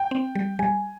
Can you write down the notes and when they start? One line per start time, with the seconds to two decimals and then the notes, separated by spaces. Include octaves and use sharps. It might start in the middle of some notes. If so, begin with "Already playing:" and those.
Already playing: G5
0.11 C4
0.35 G3
0.59 G3 G#5